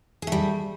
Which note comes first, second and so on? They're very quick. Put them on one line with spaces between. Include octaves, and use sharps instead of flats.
G#4 A3 G3